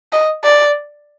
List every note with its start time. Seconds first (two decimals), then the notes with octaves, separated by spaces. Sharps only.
0.12 D#5
0.44 D5